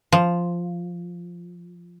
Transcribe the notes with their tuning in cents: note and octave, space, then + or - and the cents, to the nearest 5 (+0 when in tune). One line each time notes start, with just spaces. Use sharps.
F3 -5